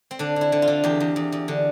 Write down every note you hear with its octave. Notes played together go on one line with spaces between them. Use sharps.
C4
D3 D4
D3 E4
D3
F4
D3
E2 G4
E2
E2
E2
D3